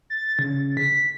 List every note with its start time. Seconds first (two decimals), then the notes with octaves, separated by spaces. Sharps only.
0.10 A6
0.39 C#3
0.77 B6